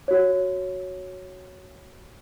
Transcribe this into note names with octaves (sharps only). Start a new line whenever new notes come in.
F#4 C#5